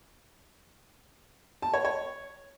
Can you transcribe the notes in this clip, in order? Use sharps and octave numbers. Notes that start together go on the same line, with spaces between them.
A5
C#5
C#5